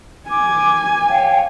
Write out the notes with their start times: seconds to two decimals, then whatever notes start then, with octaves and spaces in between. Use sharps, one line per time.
0.29 G#5 D6
1.08 C#5 F5 G5